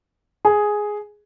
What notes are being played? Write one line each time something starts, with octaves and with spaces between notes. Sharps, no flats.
G#4